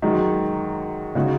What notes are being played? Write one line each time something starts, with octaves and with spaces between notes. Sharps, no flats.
F#2 D#3 G#3
C#3 G#3 D#4 F#4